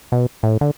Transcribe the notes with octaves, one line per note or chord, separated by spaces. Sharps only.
B2
A2
D3